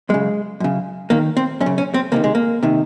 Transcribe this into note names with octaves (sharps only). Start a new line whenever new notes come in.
F#2 C#3 G#3
F#2 C#3
D#2 D#3 A#3
C4
F#2 C#4
C#3
C#4
C4
C#2 C3 D#3 A#3
G#3
A#3
C3 D#3